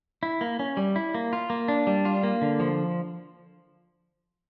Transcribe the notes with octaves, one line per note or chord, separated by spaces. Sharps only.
E4
A#3
C#4
G3
E4
A#3
F4
A#3
D4
G3
F4
A#3
D3
F3